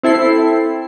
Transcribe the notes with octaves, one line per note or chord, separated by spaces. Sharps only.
C4 E4 A4 C7